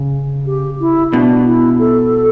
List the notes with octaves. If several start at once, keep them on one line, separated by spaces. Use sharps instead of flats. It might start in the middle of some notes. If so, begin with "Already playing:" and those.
Already playing: C#3
G4
E4
B2 D4
E4
A4